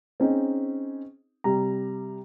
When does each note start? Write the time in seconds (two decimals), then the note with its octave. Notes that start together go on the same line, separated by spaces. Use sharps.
0.20 C4 C#4 D#4 G#4
1.44 C3 G3 A#5